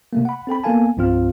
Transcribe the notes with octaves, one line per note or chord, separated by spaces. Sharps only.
C3 A3 A#3
F#5 B5
C4 A4 G5 B5
A#3 B3 A4 F5 G#5 A5
C2 G2 F3 C4 F4 F6